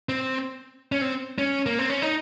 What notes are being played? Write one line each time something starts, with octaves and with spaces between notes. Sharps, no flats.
C4
C#4
C4
C#4
A#3
C4
C#4
D#4